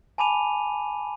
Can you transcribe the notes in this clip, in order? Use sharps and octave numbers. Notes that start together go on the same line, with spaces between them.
G#5 A5 B5 D6 D#7 F7